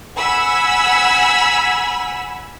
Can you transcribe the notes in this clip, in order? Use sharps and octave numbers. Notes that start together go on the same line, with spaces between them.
F#5 G#5 B5 E6